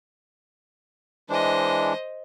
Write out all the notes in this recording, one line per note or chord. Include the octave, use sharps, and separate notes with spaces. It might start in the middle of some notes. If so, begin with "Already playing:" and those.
E3 G#3 D4 C5 D#5